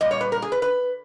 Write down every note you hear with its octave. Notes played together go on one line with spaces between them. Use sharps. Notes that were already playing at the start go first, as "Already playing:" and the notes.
A#2 G3 D#5
C#5
B4
A#4
G#4
B4
B4